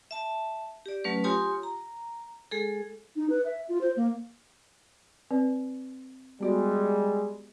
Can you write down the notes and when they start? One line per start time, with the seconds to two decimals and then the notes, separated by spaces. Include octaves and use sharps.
0.11 E5 A5
0.86 G4 D5
1.04 F#3 A3 C#4 B4
1.24 F4 G4 C#5 G#5 C6 D#6
1.63 A#5
2.51 G#3 G#4 A4
3.16 D#4
3.30 B4
3.45 E5
3.69 F4
3.81 C5
3.96 A#3
5.31 C4 B4 D5
6.41 G3 G#3 B3 F#4 D5